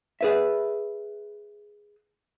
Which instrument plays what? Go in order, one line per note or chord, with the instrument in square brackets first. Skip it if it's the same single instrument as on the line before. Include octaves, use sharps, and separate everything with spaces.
[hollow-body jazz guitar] G#4 B4 E5